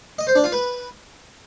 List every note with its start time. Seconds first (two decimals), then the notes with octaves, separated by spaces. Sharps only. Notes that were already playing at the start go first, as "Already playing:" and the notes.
0.19 D#5
0.27 C5
0.35 D4
0.44 F4
0.52 B4